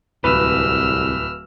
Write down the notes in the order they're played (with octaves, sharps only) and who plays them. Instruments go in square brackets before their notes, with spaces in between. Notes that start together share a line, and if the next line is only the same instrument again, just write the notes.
[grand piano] D1 [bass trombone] C2 [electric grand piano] B4 [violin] E6 F6